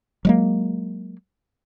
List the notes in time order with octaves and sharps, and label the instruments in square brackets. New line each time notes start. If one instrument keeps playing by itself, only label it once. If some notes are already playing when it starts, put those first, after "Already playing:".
[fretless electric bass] F#3 G#3 A#3